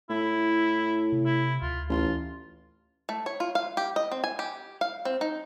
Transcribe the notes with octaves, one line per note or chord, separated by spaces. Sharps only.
A2 E4
C3
E4
D2 F4
A1 F4
A3
C#5
F4
F5
G4
D#5
C4
G#5
G4
F5
C4
D#4